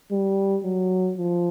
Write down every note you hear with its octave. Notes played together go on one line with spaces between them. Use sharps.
G3
F#3
F3